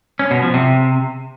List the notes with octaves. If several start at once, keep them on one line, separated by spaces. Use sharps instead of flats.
C#4
B2
F3
C3